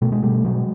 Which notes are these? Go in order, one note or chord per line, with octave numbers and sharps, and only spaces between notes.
B2 A3
G#3
B2 G3 A3
B2 F#3 G#3